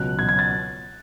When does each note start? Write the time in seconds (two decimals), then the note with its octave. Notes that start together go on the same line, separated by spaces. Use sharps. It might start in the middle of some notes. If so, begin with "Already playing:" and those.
Already playing: C#2 B2 F#3 F#6
0.18 C#2 B2 F#3 G#6
0.29 G#6
0.39 A6